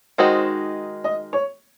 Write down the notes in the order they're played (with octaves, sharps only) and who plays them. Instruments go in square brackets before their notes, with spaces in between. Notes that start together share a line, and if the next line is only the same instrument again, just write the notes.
[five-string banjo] D#3 G#3 D#4 F#4 [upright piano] C5
[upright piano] D#5
C#5